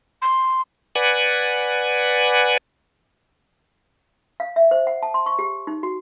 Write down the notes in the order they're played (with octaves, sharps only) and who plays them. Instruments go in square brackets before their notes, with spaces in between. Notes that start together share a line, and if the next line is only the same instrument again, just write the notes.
[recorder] C6
[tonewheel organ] B4 D5 F#5 G#5
[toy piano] F5
E5
C5
F#5
A5
C6
C#6
G4
D#4
F#4